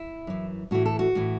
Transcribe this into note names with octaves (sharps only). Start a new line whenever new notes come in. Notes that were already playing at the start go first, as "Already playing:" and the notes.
Already playing: E4
F#2 E3
A2 E3 F#4
A4
F#4
A2 E3